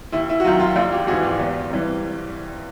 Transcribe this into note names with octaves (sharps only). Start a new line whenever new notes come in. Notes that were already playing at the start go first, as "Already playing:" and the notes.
D#2 E4
E4
F#4
D#3 F#3 F4
F4
A#1 F4
F4 G4
G#2 E3 F#4 G#4
F4 G4
E2
C3 E3 G3